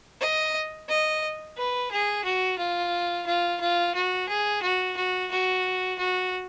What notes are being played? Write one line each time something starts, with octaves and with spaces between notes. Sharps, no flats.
D#5
D#5
B4
G#4
F#4
F4
F4
F4
F#4
G#4
F#4
F#4
F#4
F#4